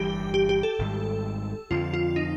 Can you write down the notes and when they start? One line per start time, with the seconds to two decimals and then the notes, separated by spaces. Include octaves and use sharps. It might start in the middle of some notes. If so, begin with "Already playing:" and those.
Already playing: G1 G2 E3 G3 G4
0.34 G4
0.49 G4
0.63 A4
0.79 G#1 G#2 D#3 G3
1.71 F2 D3 F3 F4
1.94 F4
2.16 D#4